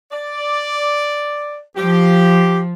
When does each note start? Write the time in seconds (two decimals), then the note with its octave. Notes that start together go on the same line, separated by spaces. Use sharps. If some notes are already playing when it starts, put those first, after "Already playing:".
0.12 D5
1.77 F3 G4